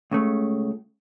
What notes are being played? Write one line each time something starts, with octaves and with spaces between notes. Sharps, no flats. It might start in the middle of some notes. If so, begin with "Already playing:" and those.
C#2 C#3 A3